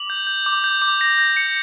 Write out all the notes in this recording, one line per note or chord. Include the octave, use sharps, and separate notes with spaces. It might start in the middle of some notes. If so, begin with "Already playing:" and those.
Already playing: D6 F#7
G6
G6
D6
G6
D6
G6 A#6
G6
G6 C#7